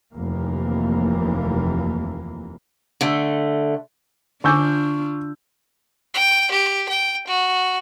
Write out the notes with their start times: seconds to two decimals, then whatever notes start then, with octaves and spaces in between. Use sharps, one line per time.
0.13 F1 D#2 E3 A#3
3.01 D3 A3
4.44 D3 D4 F4 G#5 C#6 D6 E6 G6
6.14 G5
6.51 G4
6.89 G5
7.27 F#4